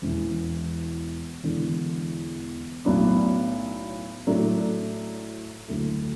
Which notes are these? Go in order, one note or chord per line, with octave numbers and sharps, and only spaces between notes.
E1 E2 E3 B3
E1 E2 D3
B1 A2 F#3 B3 D4
A2 F#3 A3 D4
D2 D3 F#3 A3 E4